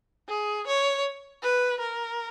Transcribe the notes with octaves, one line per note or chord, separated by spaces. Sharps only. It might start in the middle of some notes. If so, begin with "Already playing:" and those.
G#4
C#5
B4
A#4